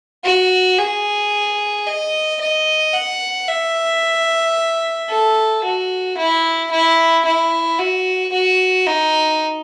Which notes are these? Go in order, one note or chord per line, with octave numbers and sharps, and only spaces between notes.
F#4
G#4
D#5
D#5
F#5
E5
A4
F#4
E4
E4
E4
F#4
F#4
D#4